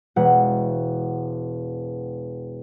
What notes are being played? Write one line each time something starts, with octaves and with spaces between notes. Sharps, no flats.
E1 F#5